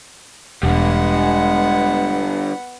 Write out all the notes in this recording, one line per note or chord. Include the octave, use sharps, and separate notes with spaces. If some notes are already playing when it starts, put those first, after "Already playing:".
E1 D3 G3 G#3 B3 F#5